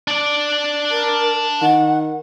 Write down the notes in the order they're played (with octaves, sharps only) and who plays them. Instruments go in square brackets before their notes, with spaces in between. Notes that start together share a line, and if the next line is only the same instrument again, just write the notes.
[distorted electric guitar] D4 D5
[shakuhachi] A#4
[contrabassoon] D#3 [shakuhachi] F#5